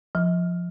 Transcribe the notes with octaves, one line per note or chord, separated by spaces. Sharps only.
F3